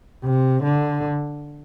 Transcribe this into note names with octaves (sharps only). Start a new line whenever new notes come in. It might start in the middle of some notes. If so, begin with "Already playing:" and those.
C3
D3